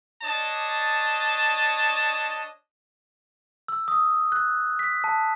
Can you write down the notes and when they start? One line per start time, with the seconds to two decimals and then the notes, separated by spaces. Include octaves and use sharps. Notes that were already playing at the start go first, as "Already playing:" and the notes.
0.22 D4 C#5 D#5 A5
3.68 E6
3.88 D#6
4.32 F#6
4.79 B6
5.04 A5